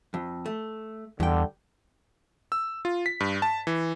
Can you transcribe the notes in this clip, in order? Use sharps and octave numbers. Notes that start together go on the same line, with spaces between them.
F2
A3
E2 G2 D3 G5
E6
F4
B6
G2
A5
E3